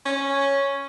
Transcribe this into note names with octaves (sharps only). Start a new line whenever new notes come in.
C#4